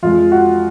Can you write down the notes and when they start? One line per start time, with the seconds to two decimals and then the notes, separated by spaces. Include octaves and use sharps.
0.03 F2 F3 G#3 F4
0.32 F#4